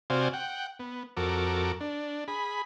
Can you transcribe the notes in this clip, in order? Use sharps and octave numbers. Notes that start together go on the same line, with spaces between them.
C3 F#4 C5 D5 F5 G#5
F#5 G5
B3
F2 F#4 A4 A#4 D6
D4
G#4 B5